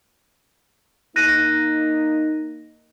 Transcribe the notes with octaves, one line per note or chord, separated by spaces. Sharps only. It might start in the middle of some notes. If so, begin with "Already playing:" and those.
A#3 D#4 F#6 A#6 D#7